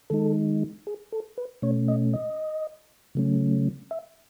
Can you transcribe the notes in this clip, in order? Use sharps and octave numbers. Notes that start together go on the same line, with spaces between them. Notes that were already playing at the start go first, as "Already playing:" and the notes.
D#3 G#3 D#4 A4
G#4
A4
B4
B2 A3 C#4 C#5
D#5
D#5
C#3 F#3 A3 C#4
E5